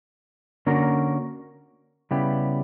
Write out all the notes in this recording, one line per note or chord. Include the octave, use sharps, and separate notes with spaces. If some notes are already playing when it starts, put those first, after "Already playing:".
D3 A#3 C#4 F#4 A#4
C#3 G3 B3 E4 G4